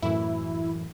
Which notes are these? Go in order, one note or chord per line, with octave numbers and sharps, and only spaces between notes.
F#2 A2 E3 E4